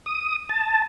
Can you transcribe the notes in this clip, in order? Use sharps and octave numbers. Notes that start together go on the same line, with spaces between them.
D#6
A5